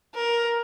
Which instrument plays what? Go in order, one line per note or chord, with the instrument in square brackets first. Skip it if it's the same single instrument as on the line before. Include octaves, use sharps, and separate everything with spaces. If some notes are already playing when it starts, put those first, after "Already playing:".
[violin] A#4